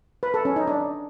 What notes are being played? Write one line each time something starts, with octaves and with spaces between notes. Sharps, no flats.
B4
A4
C#4
D#4
D4